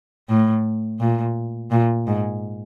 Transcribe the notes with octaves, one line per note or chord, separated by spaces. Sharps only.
A2
A#2
A#2
G#2